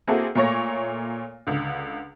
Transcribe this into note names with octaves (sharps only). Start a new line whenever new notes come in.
A#3 C4 E4 F#4 G#4 A4
A#2 A3 A#3 C#5 C#6 A#6
C#2 D3